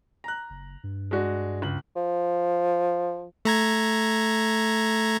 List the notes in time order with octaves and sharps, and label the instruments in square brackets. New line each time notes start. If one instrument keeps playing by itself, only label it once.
[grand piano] A#5 F#6
[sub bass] F#1
G2
[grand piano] G#3 D4 F#4
C#2 F#7
[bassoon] F3
[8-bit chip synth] A3 A#5 G#6